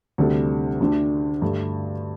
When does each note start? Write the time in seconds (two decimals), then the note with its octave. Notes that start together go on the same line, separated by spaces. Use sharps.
0.18 D2 C3 G3 D4 A4
0.80 D2 D3 A3 D4 G4
1.42 G2 D3 A3